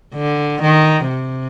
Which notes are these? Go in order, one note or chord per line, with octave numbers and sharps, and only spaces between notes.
D3
D#3
C3